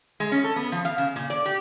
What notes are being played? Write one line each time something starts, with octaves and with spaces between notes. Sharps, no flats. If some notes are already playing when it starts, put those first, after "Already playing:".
G#3
C#4
A4
B3
F3
F5
C#3
A#2
D5
G4